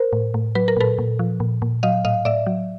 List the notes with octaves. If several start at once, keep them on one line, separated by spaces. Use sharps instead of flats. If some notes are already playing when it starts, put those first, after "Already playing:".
Already playing: A#4 C5
A2
A2
F#3 B4
A#4
A#2 A4 B4
A#2
F3
A#2
A#2
F#3 D#5 F5
A2 D#5 F5
A2 D5 E5
F#3